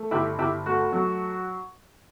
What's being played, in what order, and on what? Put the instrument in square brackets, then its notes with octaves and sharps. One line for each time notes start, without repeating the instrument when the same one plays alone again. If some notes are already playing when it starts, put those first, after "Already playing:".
Already playing: [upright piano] A3
G1 E4 G4
G1 E4 G4
A3 F#4
F#3